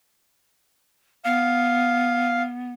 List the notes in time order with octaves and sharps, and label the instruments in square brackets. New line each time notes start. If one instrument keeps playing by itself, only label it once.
[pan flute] B3 [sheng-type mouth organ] F5